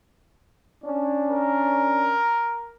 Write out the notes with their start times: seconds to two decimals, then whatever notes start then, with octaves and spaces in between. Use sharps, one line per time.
0.84 C#4 D4
1.31 A#4